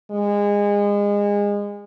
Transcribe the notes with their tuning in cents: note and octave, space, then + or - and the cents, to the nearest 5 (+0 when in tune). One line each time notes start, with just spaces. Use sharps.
G#3 -25